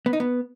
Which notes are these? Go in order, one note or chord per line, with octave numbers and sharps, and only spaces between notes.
B3
D#4
B3